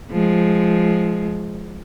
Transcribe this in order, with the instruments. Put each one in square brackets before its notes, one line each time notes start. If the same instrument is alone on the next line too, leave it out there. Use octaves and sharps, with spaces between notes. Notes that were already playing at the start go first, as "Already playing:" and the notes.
[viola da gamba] F3 G#3